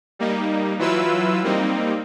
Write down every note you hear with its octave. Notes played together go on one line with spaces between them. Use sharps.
G3 A#3 D#4
E3 F#3 E4 F4 B4 E6
G3 A#3 C4 D#4